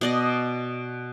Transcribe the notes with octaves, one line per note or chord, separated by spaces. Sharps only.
B2 D5 D#5